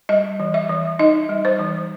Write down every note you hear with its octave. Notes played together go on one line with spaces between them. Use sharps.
G3 D#5
E3
E5
E3
D#4 D#5
G3
C5
E3